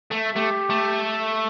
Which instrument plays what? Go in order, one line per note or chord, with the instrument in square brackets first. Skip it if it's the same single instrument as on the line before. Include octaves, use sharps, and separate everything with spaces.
[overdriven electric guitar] A3
[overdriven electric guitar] A3 [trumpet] G4
[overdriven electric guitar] A3